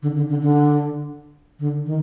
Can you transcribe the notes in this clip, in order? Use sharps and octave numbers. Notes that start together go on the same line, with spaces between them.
D3
D3
D3
D3
D3
D#3